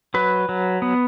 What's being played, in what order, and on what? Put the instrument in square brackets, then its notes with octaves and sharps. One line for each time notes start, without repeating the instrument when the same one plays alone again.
[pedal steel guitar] F#3 B4
F#3
B3